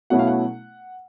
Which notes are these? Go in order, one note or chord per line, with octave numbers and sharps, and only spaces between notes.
B2 F#3 A3 C#4 E4 F#5
F5
F#5